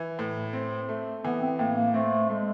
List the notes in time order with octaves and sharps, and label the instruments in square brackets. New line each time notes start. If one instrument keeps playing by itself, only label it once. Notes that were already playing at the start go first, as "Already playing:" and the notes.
Already playing: [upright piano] E3
A2
C4
A3
[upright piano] E3 [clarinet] B3
[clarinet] C4
[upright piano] A2 [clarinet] A#3
[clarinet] A#3
[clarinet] A3 [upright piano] C4
[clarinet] G#3 [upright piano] A3